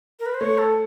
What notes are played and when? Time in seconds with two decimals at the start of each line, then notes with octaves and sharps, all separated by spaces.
0.20 A#4
0.26 B4
0.34 C5
0.40 A3 C#5
0.58 A4